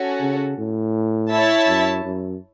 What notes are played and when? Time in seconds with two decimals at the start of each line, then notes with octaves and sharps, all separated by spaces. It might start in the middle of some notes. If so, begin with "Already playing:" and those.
Already playing: C#4 F#4 A4
0.21 C#3
0.58 A2
1.31 E4 C#5 E5 A5
1.67 F#2
2.04 F#2